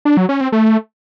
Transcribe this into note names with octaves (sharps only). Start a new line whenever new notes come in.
D4
F#3
C#4
C4
A3